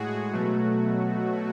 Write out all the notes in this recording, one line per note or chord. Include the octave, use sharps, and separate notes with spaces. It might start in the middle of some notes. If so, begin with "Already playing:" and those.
Already playing: A2 G#3 F#4 G#4
B2 F#3 A3